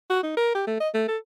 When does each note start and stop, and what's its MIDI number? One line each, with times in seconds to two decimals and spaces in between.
0.10 0.23 66
0.23 0.35 63
0.37 0.51 70
0.55 0.63 67
0.67 0.78 57
0.80 0.89 75
0.95 1.06 57
1.08 1.17 69